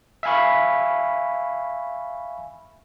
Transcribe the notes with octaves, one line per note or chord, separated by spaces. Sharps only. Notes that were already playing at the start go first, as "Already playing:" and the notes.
E5 F5 G#5 B5 C#6